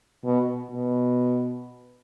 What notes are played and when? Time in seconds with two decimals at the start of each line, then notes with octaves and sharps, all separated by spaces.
0.24 B2
0.71 B2